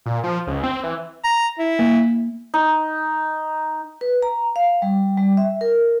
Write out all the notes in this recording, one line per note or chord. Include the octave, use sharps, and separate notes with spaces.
A#2
F3
C#2
C4
E3
A#5
E4
A#3
D#4
B4
A#5
F5
G3
G3
E5
A#4